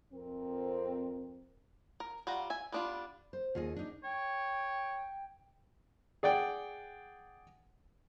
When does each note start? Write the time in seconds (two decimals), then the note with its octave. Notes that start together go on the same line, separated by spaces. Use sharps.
0.14 F2 C4 A#4
2.00 A#4
2.27 G3 F4 F#5 A#5
2.50 E5 G#5
2.72 G3 B3 D4 E4 F4
3.33 C5
3.55 D#2 F4 G#4 D#5
3.76 D4 D#4
4.04 C#5 G5
6.23 G#4 D5 F#5 G5